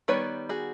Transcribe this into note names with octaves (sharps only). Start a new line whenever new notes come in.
D#3 G3 B3 B4 C#5
F#4 G#4